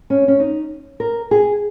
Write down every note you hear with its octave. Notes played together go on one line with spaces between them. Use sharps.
C#4
C#4
D#4
A#4
G#4